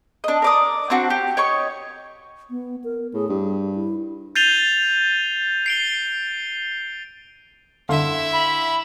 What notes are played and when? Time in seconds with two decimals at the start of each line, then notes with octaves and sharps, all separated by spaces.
0.24 D4 D#5
0.42 A#4 D5 D#6
0.90 C4 D4 F#4
1.10 G4
1.37 C#5 D#5 C#6
2.50 B3
2.84 A#4
3.13 A2 G#4
3.29 G2 G4
3.75 E4
4.36 G6 A6 C7 D#7 F7 G7
5.66 C7 D7 G7
7.89 D3 E4 E5 F5 C6
8.33 B5